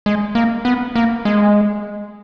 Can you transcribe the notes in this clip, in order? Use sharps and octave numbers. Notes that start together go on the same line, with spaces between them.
G#3
A#3
B3
A#3
G#3